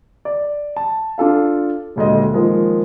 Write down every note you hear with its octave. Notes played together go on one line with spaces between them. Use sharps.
D5
A5
D4 F4 A4 F5
D#1 D2 G#3 D#5
D#3 F3 G#3 A#3